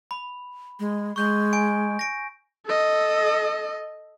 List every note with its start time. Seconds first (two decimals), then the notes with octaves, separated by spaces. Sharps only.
0.11 B5
0.80 G#3
1.16 G#3 C#6 G6
1.53 G#5 D7
1.99 A#6 D7
2.66 A4 D#5